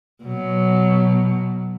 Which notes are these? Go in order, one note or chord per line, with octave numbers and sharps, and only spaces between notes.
B2 F#3